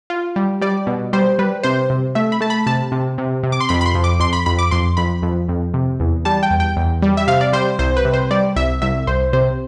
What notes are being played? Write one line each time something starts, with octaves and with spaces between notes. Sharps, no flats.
F4
G3
G3 D5
B2
G3 C5
G3 B4
C3 C5
C3
A3 E5
B5
A3 A5
B5
C3 A5
C3
C3
C3
D6
C6
F2 B5
B5
C6
F2
D6
F2 C6
B5
F2 B5
D6
F2 C6
F2 B5
F2
F2
C3
E2
G3 A5
G5
E2
G5
E2
G3
E5
C3 F5
D5
G3 C5
C2 C5
B4
C3
C5
G3 D5
C2 E5
C2 E5
C2 C5
C3 C5